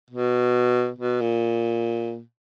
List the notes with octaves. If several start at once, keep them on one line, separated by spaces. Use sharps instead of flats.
B2
B2
A#2